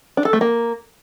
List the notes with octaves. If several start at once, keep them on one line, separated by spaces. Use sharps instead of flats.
D4
A4
A3
A#3